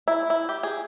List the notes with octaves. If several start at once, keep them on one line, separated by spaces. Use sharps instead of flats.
E4
E4
G4
G#4